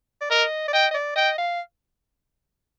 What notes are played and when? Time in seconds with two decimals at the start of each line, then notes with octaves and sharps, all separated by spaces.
0.21 D5
0.30 A#4 D#5
0.68 D5
0.73 D#5 G5
0.91 D#5
0.94 D5
1.16 D#5 G5
1.38 F5